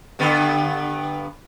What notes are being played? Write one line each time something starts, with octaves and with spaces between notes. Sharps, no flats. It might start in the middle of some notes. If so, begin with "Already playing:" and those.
G2 D3 B3